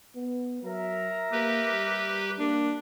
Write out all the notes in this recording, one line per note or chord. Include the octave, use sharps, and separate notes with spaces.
B3
F#3 A#4 E5 A#5
A#3 G4 B4
G3
A#3 D4